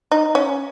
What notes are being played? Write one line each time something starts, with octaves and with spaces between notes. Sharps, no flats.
D#4
C#4